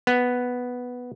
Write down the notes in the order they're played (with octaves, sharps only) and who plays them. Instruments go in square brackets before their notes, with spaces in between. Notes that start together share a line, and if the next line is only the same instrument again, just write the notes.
[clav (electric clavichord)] B3